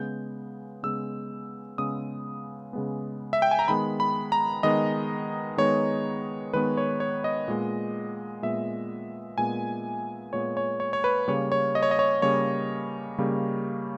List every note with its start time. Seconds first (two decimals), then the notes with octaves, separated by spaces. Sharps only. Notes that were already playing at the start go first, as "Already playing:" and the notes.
Already playing: C#3 G#3 B3 G6
0.83 C#3 G#3 B3 E6
1.78 C#3 G#3 B3 D#6
2.73 C#3 G#3 B3
3.33 E5
3.42 G5
3.51 G#5
3.59 A#5
3.68 D#3 G#3 B3 B5
4.00 B5
4.32 A#5
4.63 D#3 G#3 B3 D#5
5.57 D#3 G#3 B3 C#5
6.54 D#3 G#3 B3 B4
6.77 C#5
7.00 C#5
7.24 D#5
7.48 A#2 G#3 B3
8.43 A#2 G#3 B3 E5
9.38 A#2 G#3 B3 G#5
10.33 A#2 G#3 B3 C#5
10.57 C#5
10.80 C#5
10.93 C#5
11.04 B4
11.28 C#3 G3 A#3 C#5
11.52 C#5
11.75 D#5
11.83 C#5
11.91 D#5
11.99 C#5
12.22 C#3 G3 A#3 C#5
13.18 C#3 G3 A#3